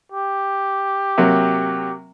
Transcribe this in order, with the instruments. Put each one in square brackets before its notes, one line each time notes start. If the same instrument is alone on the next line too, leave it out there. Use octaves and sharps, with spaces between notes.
[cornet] G4
[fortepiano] C3 F#3 A#3